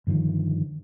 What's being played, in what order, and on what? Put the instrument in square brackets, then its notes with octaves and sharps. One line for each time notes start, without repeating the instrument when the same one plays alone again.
[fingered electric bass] G2 D3 D#3 F3